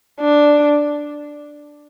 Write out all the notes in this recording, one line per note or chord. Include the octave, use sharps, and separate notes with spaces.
D4